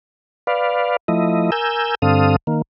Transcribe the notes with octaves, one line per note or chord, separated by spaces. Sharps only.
B4 D5 F5
F3 A3 E4 D#5
A#4 G#5 E6 G6
G2 D3 C4 A4 F5 D#6
D#3 A#3